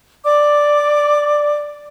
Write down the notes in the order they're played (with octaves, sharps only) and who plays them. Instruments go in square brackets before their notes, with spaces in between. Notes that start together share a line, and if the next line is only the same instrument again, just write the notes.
[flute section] D5 D6